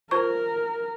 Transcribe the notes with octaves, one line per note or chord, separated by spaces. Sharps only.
F4 A#4 C5 C#6